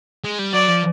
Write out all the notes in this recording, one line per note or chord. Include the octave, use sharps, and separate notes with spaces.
G#3
G3
F#3 D5
F3